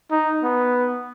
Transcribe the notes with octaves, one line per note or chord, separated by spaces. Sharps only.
D#4
B3